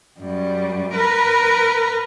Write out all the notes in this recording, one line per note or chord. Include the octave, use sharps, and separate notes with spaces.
F#2 G3
A#4 B4